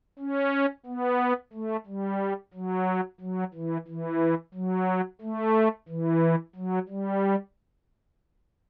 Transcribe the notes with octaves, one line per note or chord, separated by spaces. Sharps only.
C#4
B3
A3
G3
F#3
F#3
E3
E3
F#3
A3
E3
F#3
G3